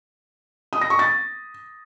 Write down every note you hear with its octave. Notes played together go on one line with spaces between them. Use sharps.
D#6
A#6
C#6
A6